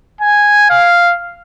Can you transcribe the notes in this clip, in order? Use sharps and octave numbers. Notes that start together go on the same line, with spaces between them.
G#5
F5